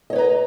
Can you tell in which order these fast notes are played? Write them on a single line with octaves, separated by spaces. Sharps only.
D#5 C#5 B4 A#5